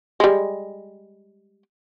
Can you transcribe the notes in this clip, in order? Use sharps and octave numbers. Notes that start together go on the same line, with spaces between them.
G3 G#3